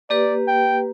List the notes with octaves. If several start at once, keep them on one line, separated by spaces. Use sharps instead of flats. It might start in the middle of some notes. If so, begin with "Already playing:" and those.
A#3 G4 B4 D5
G5